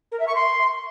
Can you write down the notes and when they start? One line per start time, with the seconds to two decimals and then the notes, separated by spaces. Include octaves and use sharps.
0.11 A#4
0.19 E5
0.27 C#6
0.35 C6